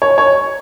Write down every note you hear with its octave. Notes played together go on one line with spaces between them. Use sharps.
C#5
C#5